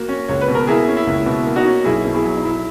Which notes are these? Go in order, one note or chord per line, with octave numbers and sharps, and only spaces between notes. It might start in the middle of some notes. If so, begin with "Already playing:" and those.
Already playing: A#3 F#4
C#4
C#2 C#5
B4
B2
A#4
A#3 E4 G#4
C#4
E4
C#2
B2 E4
A#3
D#4 F#4
C#4
B1 E4 G#4
B2
E4 G#4
F#3
D#4
B1 E4